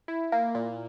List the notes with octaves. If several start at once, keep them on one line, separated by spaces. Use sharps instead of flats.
E4
A#3
A#2